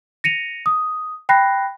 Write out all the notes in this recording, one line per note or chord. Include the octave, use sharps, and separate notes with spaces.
A#6 C#7 D#7 F7
D#6
G5 B5 F#6 A#6 C7